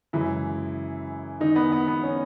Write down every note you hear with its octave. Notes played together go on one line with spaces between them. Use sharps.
F#2 C#3 E3 G#3 E4
D#3 D#4
B3
B3
B3
C#4